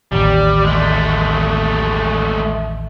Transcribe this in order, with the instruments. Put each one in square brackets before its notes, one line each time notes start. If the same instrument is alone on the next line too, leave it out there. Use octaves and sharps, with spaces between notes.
[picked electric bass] A1 D#2 [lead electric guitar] G3
[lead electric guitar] G#3 A3